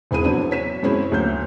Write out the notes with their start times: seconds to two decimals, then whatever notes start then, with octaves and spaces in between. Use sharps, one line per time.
0.11 E1 C4 E4 G#4 D#7
0.24 F#3 B3 C4 D4 E4
0.51 C#5 B6 E7
0.83 F#2 B2 G#3 C4 C#4 E4
1.12 D2 F#3 A#3 G6